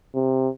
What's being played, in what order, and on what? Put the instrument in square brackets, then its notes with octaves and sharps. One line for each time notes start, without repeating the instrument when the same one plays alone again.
[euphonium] C3